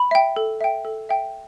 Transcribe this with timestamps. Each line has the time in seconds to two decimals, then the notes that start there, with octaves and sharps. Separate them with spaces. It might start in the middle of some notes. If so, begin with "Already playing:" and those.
Already playing: B5
0.11 E5 G5
0.36 A4
0.61 E5 G5
0.85 A4
1.09 E5 G5